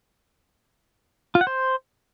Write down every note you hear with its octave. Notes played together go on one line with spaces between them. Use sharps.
F4
F#5
C5